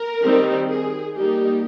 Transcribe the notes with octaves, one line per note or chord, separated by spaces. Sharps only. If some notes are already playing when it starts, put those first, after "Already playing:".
Already playing: A#4
D#3 G3 C4 D#4
G#4
G3 A#3 D#4 G4